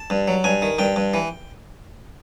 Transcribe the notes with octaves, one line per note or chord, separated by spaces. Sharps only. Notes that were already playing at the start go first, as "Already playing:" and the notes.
Already playing: A5
G2
F#3
G2 G#5
D#3
G2 G5
G2
E3